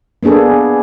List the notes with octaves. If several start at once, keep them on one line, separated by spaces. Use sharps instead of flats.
A#3 B3 D4 G#4 A4